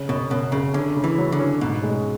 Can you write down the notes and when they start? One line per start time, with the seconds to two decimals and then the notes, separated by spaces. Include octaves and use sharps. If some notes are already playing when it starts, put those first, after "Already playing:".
Already playing: C#3
0.09 F#2 B2
0.31 F#2 B2
0.52 F#2 C#3
0.74 D3 C#4
0.96 C#3
1.04 E3
1.18 F#3
1.32 D3
1.39 C#4
1.61 G#2 B2
1.83 G#3